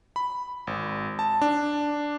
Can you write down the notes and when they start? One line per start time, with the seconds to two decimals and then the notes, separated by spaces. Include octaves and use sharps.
0.16 B5
0.67 G#1
1.19 A5
1.42 D4